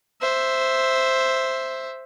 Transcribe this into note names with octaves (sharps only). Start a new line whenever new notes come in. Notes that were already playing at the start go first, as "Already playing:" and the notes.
C5 E5